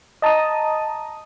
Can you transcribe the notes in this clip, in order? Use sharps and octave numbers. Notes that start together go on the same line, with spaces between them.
D#5 A5 A#5 D#6